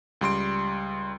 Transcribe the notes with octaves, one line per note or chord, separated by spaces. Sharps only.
C#2 G3 C6 D7